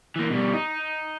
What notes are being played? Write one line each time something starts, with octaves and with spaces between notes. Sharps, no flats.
E3 A#3
B2 G3
D#4